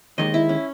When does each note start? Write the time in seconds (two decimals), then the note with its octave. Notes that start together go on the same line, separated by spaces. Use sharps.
0.18 D#2 D#3 G#3 D#5
0.34 E4
0.49 C#4